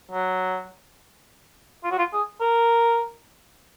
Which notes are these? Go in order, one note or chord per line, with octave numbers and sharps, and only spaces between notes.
F#3
F4
F#4
F4
G#4
A#4